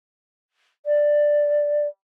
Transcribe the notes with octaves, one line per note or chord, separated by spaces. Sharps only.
D5